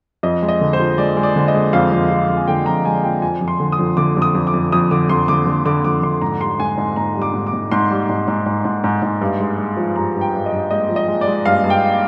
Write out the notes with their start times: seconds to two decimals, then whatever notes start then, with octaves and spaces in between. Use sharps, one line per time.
0.23 F2 D#5
0.42 G#3
0.48 D#5
0.61 D3
0.73 C5
0.79 F3
0.98 G#3 D5
1.17 G#3
1.23 D5
1.36 D3
1.48 D#5
1.54 G#3
1.73 F2 F5
1.92 F2
2.10 F3
2.28 F2
2.37 G#5
2.48 D3 G5
2.66 F2 A#5
2.85 G#3 G#5
3.04 F3 G5
3.22 F2 G#5
3.41 F2
3.48 C6
3.60 D3
3.72 D#6
3.79 F2
3.97 D3 D6
4.17 F2
4.22 D#6
4.35 F2
4.47 D6
4.54 F2
4.72 F2 D#6
4.91 D3 D6
5.09 F2 C6
5.28 D3 D6
5.47 D3
5.65 D3 D6
5.84 F2 D6
6.03 D3 C6
6.22 G#2 A#5
6.41 G3 C6
6.60 G#2 G#5
6.78 G#2 G#5
6.96 G#2 A#5
7.15 G3
7.22 D6
7.34 G#2
7.47 D6
7.53 G#2
7.71 G#2 C6
7.90 G3
8.09 G#2
8.28 G#2
8.46 G#2
8.65 G#2
8.84 G#2
9.03 G#2
9.21 G2
9.40 G#3
9.58 G#3
9.77 F3
9.96 G2 A#5
10.14 G2
10.21 G5
10.34 G2
10.46 D#5
10.52 G2
10.71 G#3 D#5
10.89 F3
10.96 D#5
11.08 G#3
11.21 D5
11.27 G#3
11.45 G2 F5
11.64 G2
11.70 G5